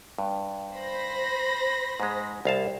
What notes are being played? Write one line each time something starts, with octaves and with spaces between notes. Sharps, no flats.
G2
C5 B5 A#6
G#2 G#3
C2 F5 A5